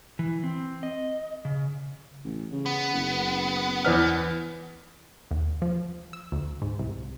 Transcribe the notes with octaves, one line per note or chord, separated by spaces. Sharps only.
E3
C4
D#5
C#3
A1
C#3
B3
F#1
E2 B4 F6
D#2
F3
E6
D2
G#2
C2